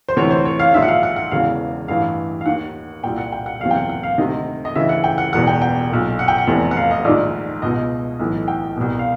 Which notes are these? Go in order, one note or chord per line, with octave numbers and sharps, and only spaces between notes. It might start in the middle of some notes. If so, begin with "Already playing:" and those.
C5
D2 C3 E3 C#5
C5
C#5
F5
A#1 G#2 D#3 E5
F#5
F5
F#5
F#5
E1 E2 C#3 E3 F5
A1 G2 E3 F5
F5
D#2 D#3 F#5
C2 A#2 G5
F#5
G5
F#5
F#1 E2 C3 F5
G5
F#5
F#5
F5
D2 C3 D#3 D#5
D#5
D2 C#3 E3 E5
F#5
G5
F#5
E1 E2 B2 F#5
G5
G5
B1 A#2
F#5
G5
F#5
F1 E2 C3
F#5
F5
D#5
A#1 G#2 D#3 D5
C#2 B2 D#5
B1 A2 E3
G5
C2 B2
F5